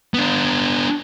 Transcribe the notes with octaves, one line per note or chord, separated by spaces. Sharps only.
B3 D4